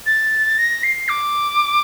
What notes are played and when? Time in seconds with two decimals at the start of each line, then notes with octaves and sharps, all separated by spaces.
0.06 A6
0.58 A#6
0.83 C7
1.09 D6